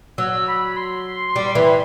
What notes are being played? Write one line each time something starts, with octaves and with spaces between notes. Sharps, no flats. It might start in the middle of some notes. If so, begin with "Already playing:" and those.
F#3 E6
B5
C6
G3
E3